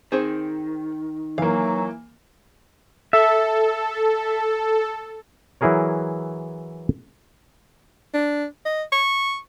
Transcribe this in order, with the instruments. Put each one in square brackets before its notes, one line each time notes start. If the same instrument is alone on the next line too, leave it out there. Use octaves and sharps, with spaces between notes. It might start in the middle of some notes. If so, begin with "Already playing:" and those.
[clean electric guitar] D#3 [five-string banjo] C4 G#4 C5
[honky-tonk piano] E3 A#3 [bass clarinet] F#3 [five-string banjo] F5
[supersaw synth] A4 [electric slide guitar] E5
[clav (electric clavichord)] E3 F#3 E4 G#4 A#4 C#5
[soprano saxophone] D4
D#5
C#6